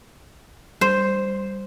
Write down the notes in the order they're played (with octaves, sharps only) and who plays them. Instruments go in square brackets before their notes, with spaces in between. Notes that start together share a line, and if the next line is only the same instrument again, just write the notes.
[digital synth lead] G3 [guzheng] C5